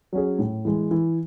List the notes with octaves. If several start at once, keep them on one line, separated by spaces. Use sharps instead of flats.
F#3 C#4 G#4
A2
E3 G#3
E3